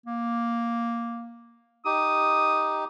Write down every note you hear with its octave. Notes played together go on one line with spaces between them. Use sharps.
A#3
D#4 G4 D#6